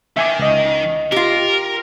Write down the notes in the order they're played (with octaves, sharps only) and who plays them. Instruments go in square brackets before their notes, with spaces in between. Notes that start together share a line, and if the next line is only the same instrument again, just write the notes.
[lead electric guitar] D#3 [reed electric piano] E5 G#5 D6
[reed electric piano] C#2 D#5
[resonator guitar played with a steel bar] F4 G4 [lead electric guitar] A#4